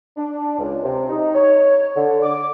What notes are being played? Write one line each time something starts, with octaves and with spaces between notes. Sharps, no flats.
D4
C#2
C3
D#4
C#5
D3
D6